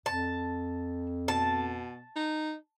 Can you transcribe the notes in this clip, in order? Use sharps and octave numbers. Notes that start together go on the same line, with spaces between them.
F2 A5
B2 A5
D#4